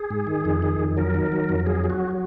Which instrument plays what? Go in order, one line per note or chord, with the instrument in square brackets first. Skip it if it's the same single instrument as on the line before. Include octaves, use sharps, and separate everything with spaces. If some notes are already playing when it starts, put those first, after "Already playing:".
Already playing: [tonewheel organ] G#4
G#2
D#3
F2
D#3
F2
F#3 A#4
D#3
F#3
F2
F#3 G#4
F#3
F#4